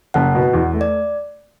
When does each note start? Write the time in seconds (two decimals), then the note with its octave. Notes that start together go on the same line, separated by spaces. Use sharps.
0.14 F#1 F#5
0.35 B2
0.53 E2
0.73 A3
0.81 D5